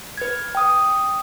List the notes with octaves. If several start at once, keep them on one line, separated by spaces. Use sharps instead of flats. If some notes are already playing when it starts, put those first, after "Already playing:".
B4 G#6
G5 D#6